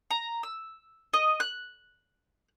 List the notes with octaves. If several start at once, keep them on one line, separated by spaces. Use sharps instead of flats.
A#5
E6
D#5
F#6